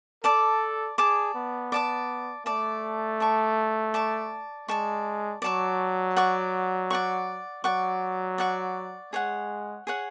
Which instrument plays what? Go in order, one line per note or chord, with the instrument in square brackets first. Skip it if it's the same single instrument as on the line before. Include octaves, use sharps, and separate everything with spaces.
[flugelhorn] A4 [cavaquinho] D5 A5 D6
[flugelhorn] G#4 [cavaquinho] D5 A5 D6
[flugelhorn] B3
[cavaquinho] D5 A5 D6
[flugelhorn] A3 [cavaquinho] D5 A5 D6
[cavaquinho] D5 A5 C#6
D5 A5 C#6
[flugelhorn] G#3 [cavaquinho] D5 A5 C#6
[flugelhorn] F#3 [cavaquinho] D5 A5 C#6
[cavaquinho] D5 F#5 C#6
D5 F#5 C#6
[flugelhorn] F#3 [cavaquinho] D5 F#5 C#6
[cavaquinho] D5 F#5 C#6
[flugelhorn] G#3 [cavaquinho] G#4 C#5 F#5
[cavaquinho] G#4 C#5 F#5